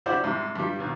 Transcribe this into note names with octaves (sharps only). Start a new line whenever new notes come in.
D4 E4 F#4 G4 C5 D5
G#2 C3 G3
G2 G3
D#2 B2